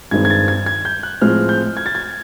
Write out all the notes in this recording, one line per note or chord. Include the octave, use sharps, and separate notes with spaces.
G2 D#3 G#3 C4 G#6
G#6
A6
G#6
G#6
G6
F#6
A2 F3 G#3 C4 F6
G6
G#6
A6
G#6